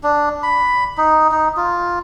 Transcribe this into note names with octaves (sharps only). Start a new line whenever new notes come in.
D4
B5
D#4
D#4
F4